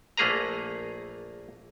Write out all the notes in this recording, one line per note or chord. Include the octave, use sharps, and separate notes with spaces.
A#1 A3 A#3 G#4 B4 A#5